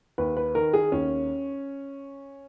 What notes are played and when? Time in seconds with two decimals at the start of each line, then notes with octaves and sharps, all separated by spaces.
0.18 D#2 B4
0.37 B4
0.55 D#3 A#4
0.74 G#4
0.92 D#2 C#4